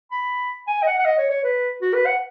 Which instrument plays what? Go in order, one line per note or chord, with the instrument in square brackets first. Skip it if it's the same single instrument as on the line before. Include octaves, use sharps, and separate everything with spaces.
[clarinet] B5
G#5
D#5
F#5
F#5
D#5
C#5
C#5
B4
F#4
B4
F#5